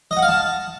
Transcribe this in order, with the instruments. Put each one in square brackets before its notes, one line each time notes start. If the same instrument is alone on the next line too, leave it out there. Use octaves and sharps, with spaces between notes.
[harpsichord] D#5
F#5
F5
A5